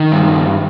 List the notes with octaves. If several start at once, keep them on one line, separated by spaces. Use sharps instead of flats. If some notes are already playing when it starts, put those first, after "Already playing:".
Already playing: D#3
G2